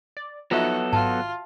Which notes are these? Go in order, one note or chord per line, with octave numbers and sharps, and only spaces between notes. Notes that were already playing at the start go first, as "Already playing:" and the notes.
D5
F3 F#3 B3 D#4 F4 F#4 A4 E5
G#1 F4 A5